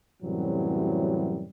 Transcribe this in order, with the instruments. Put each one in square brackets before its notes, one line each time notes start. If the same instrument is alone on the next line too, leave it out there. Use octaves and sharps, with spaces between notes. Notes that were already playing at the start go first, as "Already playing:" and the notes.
[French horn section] F#2 A2 C3 E3 F#3 G3